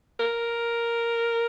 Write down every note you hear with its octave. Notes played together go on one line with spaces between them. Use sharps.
A#4